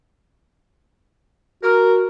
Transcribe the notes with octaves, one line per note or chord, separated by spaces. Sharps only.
F#4 A#4